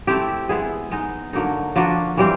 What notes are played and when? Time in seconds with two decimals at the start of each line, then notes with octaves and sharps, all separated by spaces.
0.07 A3 C4 E4 G4
0.49 G#3 B3 E4 G#4
0.91 G#3 B3 D#4
1.33 D3 F#3 A#3 D#4
1.76 F3 A#3 D4 F#4
2.17 E3 G3 C4